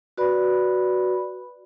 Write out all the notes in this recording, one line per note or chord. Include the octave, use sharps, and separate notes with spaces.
F#4 B4 D5 B5